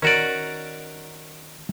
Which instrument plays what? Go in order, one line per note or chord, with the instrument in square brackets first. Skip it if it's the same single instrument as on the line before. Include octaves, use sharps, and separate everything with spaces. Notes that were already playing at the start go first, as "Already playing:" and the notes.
[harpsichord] D#3 A#4 [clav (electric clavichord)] C#4 F#4 D5